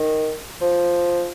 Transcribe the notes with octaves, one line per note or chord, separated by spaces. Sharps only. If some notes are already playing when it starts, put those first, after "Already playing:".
Already playing: D#3
F3